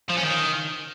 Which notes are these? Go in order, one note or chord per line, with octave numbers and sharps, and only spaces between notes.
F3
C#4
D#3